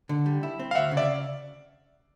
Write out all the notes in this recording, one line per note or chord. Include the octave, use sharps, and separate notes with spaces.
D3
G3
E4
C4
F5
D2 E5 F#5
C#3
D5 E5